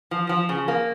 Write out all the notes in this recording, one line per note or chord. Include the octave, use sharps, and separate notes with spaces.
F3
F3
C#3
A#3